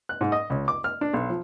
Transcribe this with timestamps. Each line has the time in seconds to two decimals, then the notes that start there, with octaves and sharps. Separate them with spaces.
0.09 F#6
0.21 G#2
0.32 D#5
0.50 C#2
0.68 D6
0.84 F6
1.01 D4
1.13 B1
1.30 F3